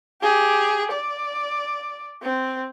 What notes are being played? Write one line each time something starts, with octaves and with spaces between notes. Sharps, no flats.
G4 G#4
D5
C4